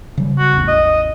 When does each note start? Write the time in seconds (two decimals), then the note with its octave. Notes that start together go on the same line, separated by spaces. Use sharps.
0.18 C#3 F#3 G3
0.38 F#4
0.53 A1 E2
0.68 D#5